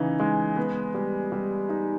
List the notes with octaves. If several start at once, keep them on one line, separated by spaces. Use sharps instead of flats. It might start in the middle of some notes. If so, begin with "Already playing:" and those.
Already playing: C#3 E3 D#4
G#3
B3
G3
G3
D#4